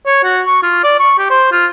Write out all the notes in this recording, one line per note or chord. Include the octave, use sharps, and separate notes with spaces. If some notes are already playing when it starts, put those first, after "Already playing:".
C#5
F#4
C#6
F4
D5
C#6
G4
C5
F4